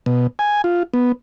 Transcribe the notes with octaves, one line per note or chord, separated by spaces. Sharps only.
B2
G#5
F4
B3